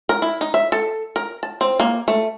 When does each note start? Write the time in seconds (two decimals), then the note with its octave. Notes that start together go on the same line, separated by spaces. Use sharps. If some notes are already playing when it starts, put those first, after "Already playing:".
0.09 A#4
0.22 E4
0.41 D#4
0.54 E5
0.72 A4
1.16 A#4
1.43 A5
1.61 C4
1.80 A#3
2.08 A3